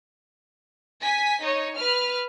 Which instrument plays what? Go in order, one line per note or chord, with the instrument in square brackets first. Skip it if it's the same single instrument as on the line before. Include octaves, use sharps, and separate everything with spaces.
[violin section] G#5 B6
D#4 C#5
B4 F6